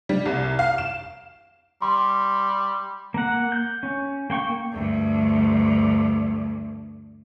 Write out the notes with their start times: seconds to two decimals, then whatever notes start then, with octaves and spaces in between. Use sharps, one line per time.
0.09 G3
0.26 C2
0.59 F5
0.78 E7
1.82 G3 C6
3.14 A#3 F#5
3.52 G6
3.83 C#4
4.30 A#3 G5 C#6
4.72 D2 G2